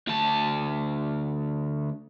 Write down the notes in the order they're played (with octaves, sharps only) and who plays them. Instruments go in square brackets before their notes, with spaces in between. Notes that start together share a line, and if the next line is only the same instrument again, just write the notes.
[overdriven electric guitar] D2 A5